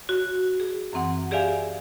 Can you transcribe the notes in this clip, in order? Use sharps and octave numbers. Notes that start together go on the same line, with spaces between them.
F#4
G#4
F#2 E3 C4 F#5
G4 G#4 D5 E5 F5 G#5